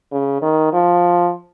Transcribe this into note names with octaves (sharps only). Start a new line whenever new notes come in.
C#3
D#3
F3